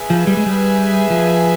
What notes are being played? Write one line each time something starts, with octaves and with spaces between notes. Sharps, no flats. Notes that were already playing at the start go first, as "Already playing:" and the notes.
Already playing: G#4 B4 E5 G#5
F3
G3
G#3
G3
F3